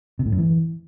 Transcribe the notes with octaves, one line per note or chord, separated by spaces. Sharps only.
C3
A2
F#2
E3